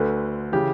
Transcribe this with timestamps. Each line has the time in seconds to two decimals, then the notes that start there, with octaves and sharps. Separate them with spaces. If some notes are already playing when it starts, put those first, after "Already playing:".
Already playing: D2 D3 B4
0.52 C#3 E3 G4